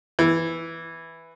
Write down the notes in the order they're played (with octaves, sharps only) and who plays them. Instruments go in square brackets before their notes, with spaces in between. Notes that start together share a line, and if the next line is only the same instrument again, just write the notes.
[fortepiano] E3